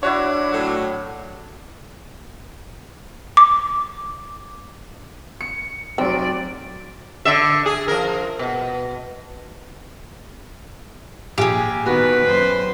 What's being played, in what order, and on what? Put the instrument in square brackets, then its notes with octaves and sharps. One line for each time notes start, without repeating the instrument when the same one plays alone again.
[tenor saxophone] D4 [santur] E4 F#4 F#5 [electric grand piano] C#5
[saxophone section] A2 F#3
[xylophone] D6
[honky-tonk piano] C#7
[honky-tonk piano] F1 [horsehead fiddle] F#3 D5 [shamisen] C4
[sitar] D3 E5
G#4
F3 A#4
B2
[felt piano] A#1 [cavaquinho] G4 G#4
[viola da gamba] D#3 B3 [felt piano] F#4 [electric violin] B4
[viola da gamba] F#2 C5